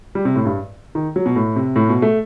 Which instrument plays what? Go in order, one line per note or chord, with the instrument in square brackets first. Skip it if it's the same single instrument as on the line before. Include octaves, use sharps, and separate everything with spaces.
[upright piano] G3
C3
A2
G2
D#3
F#3
B2
A2
C3
A2
B2
A3